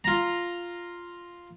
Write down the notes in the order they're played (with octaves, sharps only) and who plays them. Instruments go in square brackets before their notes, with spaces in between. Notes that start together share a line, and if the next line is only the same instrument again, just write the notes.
[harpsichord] F4 A#5